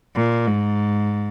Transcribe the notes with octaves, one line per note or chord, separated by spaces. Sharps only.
A#2
G#2